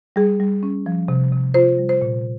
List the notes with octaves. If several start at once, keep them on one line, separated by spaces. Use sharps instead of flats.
G3 G#4
G3
C#4
F3
C3
C3
F4 C5
G3
C5
A#2